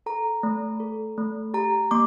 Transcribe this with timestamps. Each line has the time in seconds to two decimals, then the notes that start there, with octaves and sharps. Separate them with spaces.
0.06 A4 A#5
0.43 A3
0.80 A4
1.18 A3
1.54 G4 A#5
1.91 A#3 D6